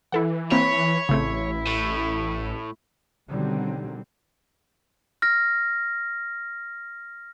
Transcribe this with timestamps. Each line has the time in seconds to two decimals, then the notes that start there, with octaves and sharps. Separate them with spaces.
0.12 E3 E4 A4 F#5
0.51 A#3 C4 E4 C#5 B5
1.09 A1 C#3 A3 C4 E4
1.67 A2
3.29 B2 D3 D#3 F#3 G3 C4
5.22 F6 A#6